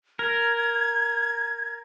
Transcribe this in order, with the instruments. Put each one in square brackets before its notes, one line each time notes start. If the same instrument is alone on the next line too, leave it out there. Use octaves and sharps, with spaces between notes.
[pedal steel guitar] A#4 [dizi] G#6